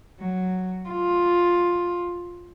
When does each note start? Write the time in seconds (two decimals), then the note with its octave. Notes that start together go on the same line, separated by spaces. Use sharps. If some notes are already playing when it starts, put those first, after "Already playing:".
0.20 F#3
0.89 F4